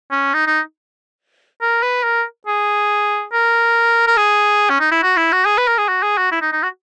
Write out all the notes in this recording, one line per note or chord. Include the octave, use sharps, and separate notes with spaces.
C#4
D#4
D#4
A#4
B4
A#4
G#4
A#4
A#4
G#4
C#4
D#4
E4
F#4
E4
F#4
G#4
B4
A#4
G#4
F#4
G#4
F#4
E4
D#4
D#4
F#4